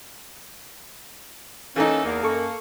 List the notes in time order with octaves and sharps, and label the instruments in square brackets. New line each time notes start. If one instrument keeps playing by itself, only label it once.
[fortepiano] E3 D#4 [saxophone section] A3 A#3 A4 [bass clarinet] C#4
[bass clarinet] E2 [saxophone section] A#3
[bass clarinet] F#2 [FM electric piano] A4 C#6